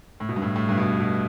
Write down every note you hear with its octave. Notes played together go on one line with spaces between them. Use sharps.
A2
B2
G2
A2
A2
G2
B2
A2
B2